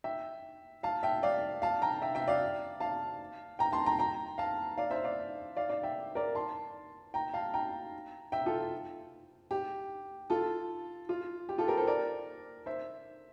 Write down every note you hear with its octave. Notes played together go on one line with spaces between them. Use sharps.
E5 G5
F5 A5
E5 G5
D5 F5
F5 A5
G5 A#5
E5 G5
E5 G5
D5 F5
F5 A5
G5 A#5
A5 C6
G5 A#5
G5 A#5
F5 A5
D5 F5
C5 E5
D5 F5
D5 F5
D5 F5
E5 G5
A#4 D5
A5 C6
G5 A#5
F5 A5
G5 A#5
E5 G5
F4 A4
G4
F4 A4
F4
G4
F4 A4
G4 A#4
A4 C5
A#4 D5
C5 E5